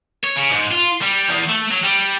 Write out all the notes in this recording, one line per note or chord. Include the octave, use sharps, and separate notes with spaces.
C#5
C#3
G#2
F4
G3
E2
A3
F#3
G3